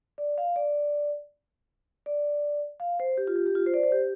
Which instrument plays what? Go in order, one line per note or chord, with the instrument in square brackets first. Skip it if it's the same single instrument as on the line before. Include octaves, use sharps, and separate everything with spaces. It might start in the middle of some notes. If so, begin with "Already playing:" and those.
[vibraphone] D5
F5
D5
D5
F5
C5
G4
F4
G4
G4
F4
C5
D5
C5
G4